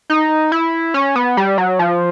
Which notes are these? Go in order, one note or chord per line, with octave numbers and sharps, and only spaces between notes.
D#4
E4
C#4
B3
G3
F#3
F3